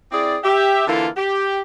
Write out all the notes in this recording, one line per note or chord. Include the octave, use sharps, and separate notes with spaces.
C4 E4 G#4 D5
G4 E5
D3 E3 A#3 E4 F4 A4
G4